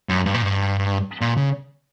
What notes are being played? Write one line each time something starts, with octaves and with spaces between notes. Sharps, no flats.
F#2
G2
A#2
G2
A#2
C#3